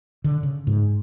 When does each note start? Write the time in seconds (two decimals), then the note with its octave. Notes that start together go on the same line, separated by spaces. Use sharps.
0.24 D3
0.43 C#3
0.67 G#2